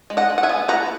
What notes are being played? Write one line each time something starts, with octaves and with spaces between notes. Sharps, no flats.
G#3
D#5 F#5
G#3
F#5
E5 G#5
B3
E4 F#5 A#5